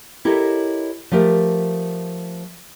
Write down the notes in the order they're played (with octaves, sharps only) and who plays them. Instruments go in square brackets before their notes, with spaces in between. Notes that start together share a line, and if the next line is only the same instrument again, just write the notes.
[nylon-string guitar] E4 G4 A4 A#4 C#5 D#5
F3 A3 G4 A#4